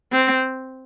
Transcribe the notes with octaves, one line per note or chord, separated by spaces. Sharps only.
C4